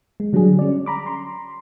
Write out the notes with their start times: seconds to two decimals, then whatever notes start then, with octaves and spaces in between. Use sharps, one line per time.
0.20 G#3
0.33 D3 F#3 G3 D4 G#4
0.59 C#4 D5
0.86 A#5 B5 D6
1.06 A#5 C6